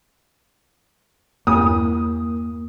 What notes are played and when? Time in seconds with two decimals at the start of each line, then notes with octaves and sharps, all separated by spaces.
1.47 E2 G2 A#3 D#6